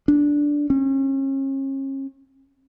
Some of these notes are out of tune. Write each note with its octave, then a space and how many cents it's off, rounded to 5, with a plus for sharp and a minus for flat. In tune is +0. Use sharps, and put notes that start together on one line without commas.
D4 -5
C#4 -40